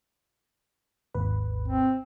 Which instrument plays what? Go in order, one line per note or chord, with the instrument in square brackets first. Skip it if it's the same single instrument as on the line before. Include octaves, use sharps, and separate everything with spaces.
[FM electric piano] G#1 D#2 B4
[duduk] C4